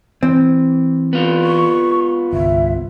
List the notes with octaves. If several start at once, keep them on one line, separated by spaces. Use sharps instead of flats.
E3 C4
B3 F4
C#6
G1 C2 E5